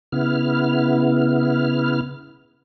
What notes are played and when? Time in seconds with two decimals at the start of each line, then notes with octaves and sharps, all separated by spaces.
0.12 C#3 B3 E4 F6